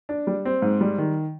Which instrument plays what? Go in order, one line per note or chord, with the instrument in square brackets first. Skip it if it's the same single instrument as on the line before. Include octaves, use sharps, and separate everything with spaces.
[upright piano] D4
G3
C4
G#2
G3
D#3